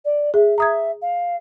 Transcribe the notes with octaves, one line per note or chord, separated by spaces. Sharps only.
D5
G#4 E5
E5 A#5 D#6 G#6
F5